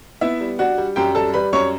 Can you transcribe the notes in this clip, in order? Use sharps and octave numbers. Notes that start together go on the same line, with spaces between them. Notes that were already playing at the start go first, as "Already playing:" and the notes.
B3 E4 E5
G3
D4 F#4 F#5
G3
F#2 G4 G5
G3 A4 A5
G3 B4 B5
F#2 C#5 C#6